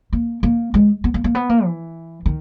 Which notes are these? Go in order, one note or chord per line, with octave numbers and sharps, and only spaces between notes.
A#3
A#3
G#3
B3
A#3
A#3
B3
A#3
E3
D#3